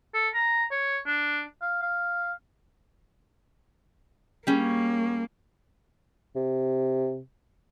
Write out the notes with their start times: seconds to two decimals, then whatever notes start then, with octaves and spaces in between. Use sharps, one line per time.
0.14 A4
0.34 A#5
0.71 C#5
1.07 D4
1.62 F5
1.82 F5
4.47 G3 A#3 C#4 G#4
6.36 C3